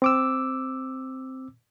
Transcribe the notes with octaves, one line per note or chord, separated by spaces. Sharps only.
C4 D6 E6